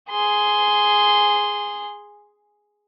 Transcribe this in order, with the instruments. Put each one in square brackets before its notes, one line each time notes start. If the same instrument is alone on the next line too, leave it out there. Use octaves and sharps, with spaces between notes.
[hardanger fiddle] G#4 C6